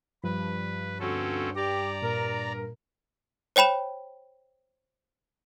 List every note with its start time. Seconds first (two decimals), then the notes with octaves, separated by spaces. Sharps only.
0.24 G2 F3 B4
1.00 D2 C4 C#4 F#4 A4
1.56 G4 D5 A#5
2.02 A#2 A#4
3.56 C5 C#5 G5 B5 E7